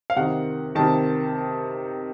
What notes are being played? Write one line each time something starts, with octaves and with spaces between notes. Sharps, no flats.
F5
C3 D#3 F#5
C3 D#3 A5